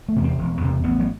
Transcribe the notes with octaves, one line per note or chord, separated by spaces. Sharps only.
A3
E2 C3
C4
E1
E2 C3
A1 B3
F#3